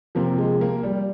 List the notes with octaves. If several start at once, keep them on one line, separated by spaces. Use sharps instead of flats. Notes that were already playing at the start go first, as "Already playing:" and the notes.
C3 F3 A#3
G#3
A#3
G3